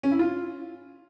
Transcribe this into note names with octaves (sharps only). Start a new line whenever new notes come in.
C#4
E4
F4